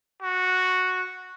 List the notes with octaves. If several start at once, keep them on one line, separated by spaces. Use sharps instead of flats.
F#4